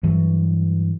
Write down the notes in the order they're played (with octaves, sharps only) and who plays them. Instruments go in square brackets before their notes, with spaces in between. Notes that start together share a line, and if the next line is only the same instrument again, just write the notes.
[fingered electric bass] G2 E3 F#3